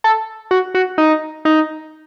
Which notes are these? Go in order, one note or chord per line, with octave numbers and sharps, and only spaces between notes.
A4
F#4
F#4
D#4
D#4